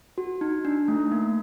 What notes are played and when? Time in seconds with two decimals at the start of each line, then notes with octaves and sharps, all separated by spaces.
0.18 F#4
0.41 D#4
0.65 D4
0.88 A3
1.12 A#3